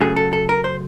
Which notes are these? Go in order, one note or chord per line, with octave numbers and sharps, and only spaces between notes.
F#2 C#3 F#3 A3 G#4
A4
A4
A#4
C5